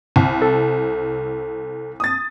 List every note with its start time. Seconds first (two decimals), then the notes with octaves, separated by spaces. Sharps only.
0.16 C2
0.42 A4
2.00 D#6 A6